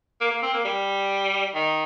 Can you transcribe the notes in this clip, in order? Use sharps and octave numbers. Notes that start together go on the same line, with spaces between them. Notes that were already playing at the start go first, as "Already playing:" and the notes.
A#3
A#3
C4
A#3
G3
D#3